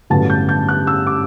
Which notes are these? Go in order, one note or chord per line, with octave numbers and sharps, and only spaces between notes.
A1 G2 D3 F#3 B3 A5
G6
G6
F#6
E6
D6